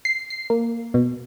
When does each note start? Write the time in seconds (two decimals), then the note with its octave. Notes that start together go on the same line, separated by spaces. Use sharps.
0.05 C7
0.30 C7
0.50 A#3
0.94 B2